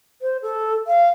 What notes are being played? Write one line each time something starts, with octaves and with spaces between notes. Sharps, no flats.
C5
A4
F5